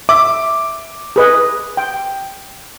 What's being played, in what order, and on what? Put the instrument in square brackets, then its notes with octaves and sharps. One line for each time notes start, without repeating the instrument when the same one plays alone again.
[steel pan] E5 [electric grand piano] D6
[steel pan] G#4 B4 D#5
G5